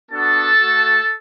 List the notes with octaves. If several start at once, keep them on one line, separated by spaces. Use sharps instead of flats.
B3 D4 F#4 A4 A5
A3 F#4